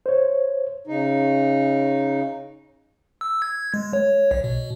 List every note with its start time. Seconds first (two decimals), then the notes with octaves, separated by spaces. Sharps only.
0.06 C5 C#5
0.87 C#3 D#4
3.21 E6
3.42 G#6
3.74 G#3
3.93 C#5
4.31 B1
4.44 B2